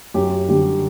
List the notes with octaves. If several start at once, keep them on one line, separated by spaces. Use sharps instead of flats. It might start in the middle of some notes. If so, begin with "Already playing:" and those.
F#2 G4
D3 G3 G4